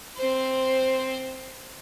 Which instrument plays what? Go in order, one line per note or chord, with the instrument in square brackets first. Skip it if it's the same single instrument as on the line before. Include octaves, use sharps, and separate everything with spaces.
[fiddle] C4 C5